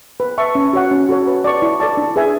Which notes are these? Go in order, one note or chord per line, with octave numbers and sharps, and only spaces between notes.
B4
E5 A5 C#6
C#4
F#4 C#5 F#5
C#4
F#4 A4 C#5
B4
D5 A5 C#6
E4
A4 D5 A5
D4
G#4 B4 E5 G#5